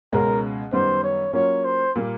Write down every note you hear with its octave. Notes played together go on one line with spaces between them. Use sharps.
C#2 B2 G#3 C#4 A#4
F#2 D#3 G3 B3 D#4 C5
C#5
F#3 A#3 C#4 F4 C#5
C5
A#2 G3 A#3